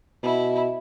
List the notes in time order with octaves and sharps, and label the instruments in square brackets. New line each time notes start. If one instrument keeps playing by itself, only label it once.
[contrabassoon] B2 [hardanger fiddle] E4